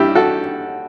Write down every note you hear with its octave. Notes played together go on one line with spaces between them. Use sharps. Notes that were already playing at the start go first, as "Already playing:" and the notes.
Already playing: G2 E4 G4
F#4 A4